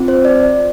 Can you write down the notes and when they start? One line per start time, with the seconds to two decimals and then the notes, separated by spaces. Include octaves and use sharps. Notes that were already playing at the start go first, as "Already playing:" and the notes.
Already playing: C4 F4
0.08 C5
0.25 D5